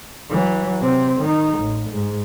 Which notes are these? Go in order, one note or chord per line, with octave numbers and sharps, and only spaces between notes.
E3 F#3
C3 C4
D#3 D#4
A1
G#2